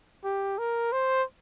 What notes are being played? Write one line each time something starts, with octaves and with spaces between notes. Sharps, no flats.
G4
A#4
C5